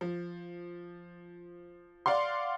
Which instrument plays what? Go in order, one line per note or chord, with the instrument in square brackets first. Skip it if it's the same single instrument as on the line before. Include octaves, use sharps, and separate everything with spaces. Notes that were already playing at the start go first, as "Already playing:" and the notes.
[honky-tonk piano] F3
D5 F5 F#5 C6